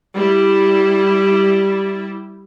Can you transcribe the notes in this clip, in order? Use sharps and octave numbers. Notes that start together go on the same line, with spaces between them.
G3 E4